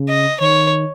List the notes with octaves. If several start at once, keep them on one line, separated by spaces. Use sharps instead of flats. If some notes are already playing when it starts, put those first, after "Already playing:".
Already playing: C#3
D#5
D#3 C#5